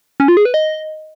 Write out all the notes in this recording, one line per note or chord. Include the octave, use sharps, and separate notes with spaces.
C#4
F4
G#4
B4
D#5